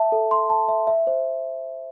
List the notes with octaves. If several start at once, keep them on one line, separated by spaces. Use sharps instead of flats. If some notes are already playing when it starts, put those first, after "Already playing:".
Already playing: E5 A5
A4
C6
A5
E5
E5
C5